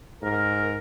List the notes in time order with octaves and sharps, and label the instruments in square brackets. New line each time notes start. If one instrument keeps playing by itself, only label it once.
[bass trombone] G#2 [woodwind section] A#4